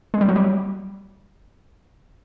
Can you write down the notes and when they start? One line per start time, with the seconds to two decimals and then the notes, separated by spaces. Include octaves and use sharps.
0.14 G#3
0.21 G3
0.29 F#3
0.36 G3